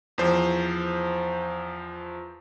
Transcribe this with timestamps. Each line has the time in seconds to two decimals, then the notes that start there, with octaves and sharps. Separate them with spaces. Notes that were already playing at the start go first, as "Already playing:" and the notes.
0.18 E2 F3 C5